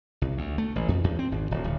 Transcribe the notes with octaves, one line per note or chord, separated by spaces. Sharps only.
C2
D2
A3
A1
F2
E2
C4
G#1
D1
D1